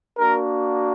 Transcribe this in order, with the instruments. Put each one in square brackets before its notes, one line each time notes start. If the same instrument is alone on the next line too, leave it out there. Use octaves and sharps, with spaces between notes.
[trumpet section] A#3 D4 F#4 A#4